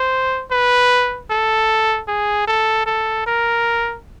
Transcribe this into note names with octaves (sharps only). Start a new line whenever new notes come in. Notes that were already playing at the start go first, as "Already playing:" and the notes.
Already playing: C5
B4
A4
G#4
A4
A4
A#4